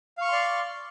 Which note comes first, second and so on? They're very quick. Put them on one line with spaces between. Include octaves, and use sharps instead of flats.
F5 C#6 F6 C6 D5